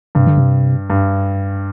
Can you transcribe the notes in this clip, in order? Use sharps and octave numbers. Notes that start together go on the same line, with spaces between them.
G2 C3
D3
C3
G2